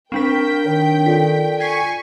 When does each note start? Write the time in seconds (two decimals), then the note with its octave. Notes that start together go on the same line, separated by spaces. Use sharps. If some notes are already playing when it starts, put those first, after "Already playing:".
0.12 C4 D4 A#4 G5 C#6 B6
0.66 D#3 C#5
1.06 F4 A4 D5 B6
1.60 G#5 C#6 G#6 B6 C7